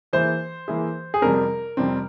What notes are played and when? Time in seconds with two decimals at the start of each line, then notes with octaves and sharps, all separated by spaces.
0.13 E3 A#3 E4 G#4 C5 E5
0.68 E3 A#3 E4 G#4 E5
1.14 G#4
1.22 F2 C3 G3 C4 A#4
1.77 F2 C3 G3 C4